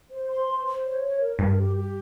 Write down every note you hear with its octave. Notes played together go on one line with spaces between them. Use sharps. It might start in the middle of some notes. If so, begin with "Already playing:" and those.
C5
C6
C5
C5
C#5
C#5
A#4
G2 A#4
G4
G4